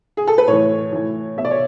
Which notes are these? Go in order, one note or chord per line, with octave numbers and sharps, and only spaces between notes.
G#4
A4
B4
A2 E3 C#5
A2 E3
B2 E5
D5
C#5